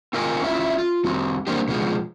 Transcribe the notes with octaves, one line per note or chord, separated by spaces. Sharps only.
C4 F4 A#4 D#5 G5 G#5
C#4 E4 F4 E5
F4
G3 C4 F#4 G4
G3 A#3 C4 D4 G4
B2 F3 G#3 B3 C4